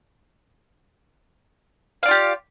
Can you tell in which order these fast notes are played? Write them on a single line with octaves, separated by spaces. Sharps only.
F5 D5 F4 G4